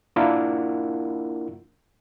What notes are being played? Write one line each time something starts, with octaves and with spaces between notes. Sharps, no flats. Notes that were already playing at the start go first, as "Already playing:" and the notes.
A#3 D4 E4 F4 A#4 F#5